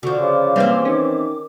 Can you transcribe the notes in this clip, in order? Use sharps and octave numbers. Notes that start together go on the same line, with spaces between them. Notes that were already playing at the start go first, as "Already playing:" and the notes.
D3 F3 F#4
C#3 D6
E3 G3 A#3 C4 F5
D#3 C#4